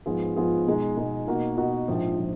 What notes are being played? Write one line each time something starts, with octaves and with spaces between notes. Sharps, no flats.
G#2 F3 B3 F4 G#4
G#2 F3 B3 F4 G#4
B2 G#3 D#4
B2 G#3 D#4
B2 A#3 D#4 F#4
B2 A#3 D#4 F#4
A#1 G#2 F3
F3